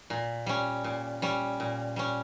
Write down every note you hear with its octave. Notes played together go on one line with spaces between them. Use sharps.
A#2
G3 C#4
A#2
G3 C#4
A#2
G3 C#4